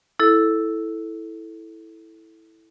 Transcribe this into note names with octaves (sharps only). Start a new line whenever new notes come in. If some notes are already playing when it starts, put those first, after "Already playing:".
E4 A4